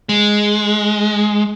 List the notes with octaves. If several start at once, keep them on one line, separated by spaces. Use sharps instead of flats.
G#3